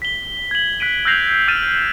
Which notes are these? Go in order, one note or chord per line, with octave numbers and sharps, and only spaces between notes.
B6 G7
G#6 F#7
F#6 B6 D7 D#7
E6 F#6 G6 A#6 C7 F7
E6 F6 A6 D#7 E7